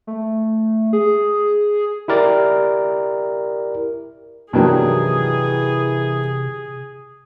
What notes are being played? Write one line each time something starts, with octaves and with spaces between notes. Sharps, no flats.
A3
G#4
E4 G4 A#4 D5
G2 C3 D#3 E3 F#3 G#4